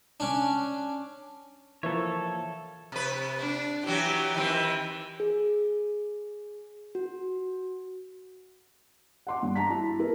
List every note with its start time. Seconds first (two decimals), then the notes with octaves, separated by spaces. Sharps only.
0.20 C#4 D4
1.83 E3 F3 A#3 A4 C#5 E5
2.92 C3 B4
3.39 D4
3.86 E3 F#3 F#4 G4
4.34 D#3 E3 C4
5.20 G#4
6.95 F#4
9.27 F#5 C6 D6
9.43 G2
9.56 A5 A#5 B6
9.70 E4
9.99 E4 A#4 B4